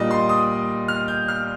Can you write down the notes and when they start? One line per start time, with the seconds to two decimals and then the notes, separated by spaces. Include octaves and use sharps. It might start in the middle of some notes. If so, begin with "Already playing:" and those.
Already playing: A#2 G3 D4 D5 D#5
0.11 C6
0.29 D#6
0.88 F6
1.08 G6
1.28 F6